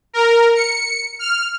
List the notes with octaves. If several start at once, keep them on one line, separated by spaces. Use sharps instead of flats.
A#4
C#7
F6